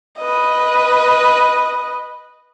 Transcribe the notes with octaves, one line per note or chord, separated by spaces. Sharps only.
B4 D#5